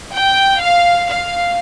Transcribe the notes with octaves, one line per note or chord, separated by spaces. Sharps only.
G5
F5
F5